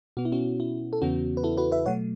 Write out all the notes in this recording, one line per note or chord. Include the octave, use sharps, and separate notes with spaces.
B2 B3 F#4
E4
C#4 F#4
E4
A4
E2 C#3 E3 B3 C#4 F#4
B4
E4 A4
F#4 B4
B4 E5
B2 F#3 A3 C#5 F#5